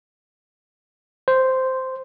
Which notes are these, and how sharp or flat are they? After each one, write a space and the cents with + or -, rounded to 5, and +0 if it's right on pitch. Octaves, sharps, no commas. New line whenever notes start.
C5 -5